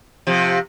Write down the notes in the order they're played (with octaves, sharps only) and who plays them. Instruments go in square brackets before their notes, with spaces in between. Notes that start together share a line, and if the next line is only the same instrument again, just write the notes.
[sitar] C3 F3